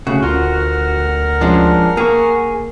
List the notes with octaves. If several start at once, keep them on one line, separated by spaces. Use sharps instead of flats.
C#3 A3 F#4 C#5
D2 F4 A#4 F#5 F6
F3 G#3 C#4 D4
A#3 G#4 C#6